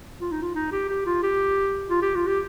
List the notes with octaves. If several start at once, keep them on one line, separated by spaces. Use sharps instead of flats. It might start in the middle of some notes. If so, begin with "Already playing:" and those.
F4
D#4
F4
D#4
G4
G4
F4
G4
F4
G4
F4
G4